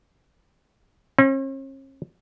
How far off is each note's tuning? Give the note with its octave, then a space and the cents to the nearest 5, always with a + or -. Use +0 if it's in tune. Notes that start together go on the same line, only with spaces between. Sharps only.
C#4 -45